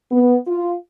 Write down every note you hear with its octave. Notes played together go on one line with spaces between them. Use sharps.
B3
F4